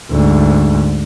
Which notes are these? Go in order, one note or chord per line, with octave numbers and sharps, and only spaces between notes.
D2 G#2